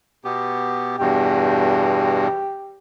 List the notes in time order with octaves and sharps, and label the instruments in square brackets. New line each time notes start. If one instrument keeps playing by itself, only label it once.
[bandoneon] B2 B3 G4
[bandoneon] E2 G2 B2 [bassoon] G4